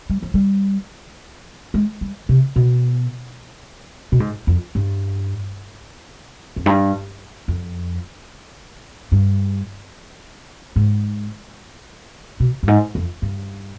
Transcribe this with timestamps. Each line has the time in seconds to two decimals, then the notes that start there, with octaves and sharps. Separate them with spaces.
0.10 G3
0.22 F3
0.34 G3
1.74 G#3
2.01 G3
2.29 C3
2.56 B2
4.12 B2
4.20 G#2
4.47 F2
4.75 G2
6.56 F2
6.66 G2
7.48 F2
9.12 G2
10.76 G#2
12.40 B2
12.63 G2
12.68 G#2
12.95 F2
13.22 G2